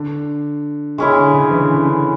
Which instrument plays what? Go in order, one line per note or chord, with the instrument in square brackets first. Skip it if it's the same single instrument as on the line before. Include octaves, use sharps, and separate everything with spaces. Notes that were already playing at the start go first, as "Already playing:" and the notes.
Already playing: [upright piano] D3
[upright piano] C#3 [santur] G#3 C#4 E4
[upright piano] D3
D3
C#3
E3
D3
C#3
D3